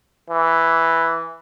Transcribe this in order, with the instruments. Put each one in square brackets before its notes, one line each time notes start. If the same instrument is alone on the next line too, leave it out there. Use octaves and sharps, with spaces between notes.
[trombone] E3